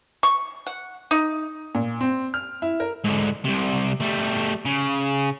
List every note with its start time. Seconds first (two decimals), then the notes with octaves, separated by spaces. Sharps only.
0.23 C#6
0.67 F#5
1.11 D#4
1.75 A#2
2.01 C4
2.34 F6
2.62 E4
2.80 A#4
3.04 G#2 D3
3.44 C2 C3
4.01 G3 A3
4.66 C#3